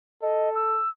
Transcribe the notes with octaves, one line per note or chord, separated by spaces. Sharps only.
A4 D#5
E6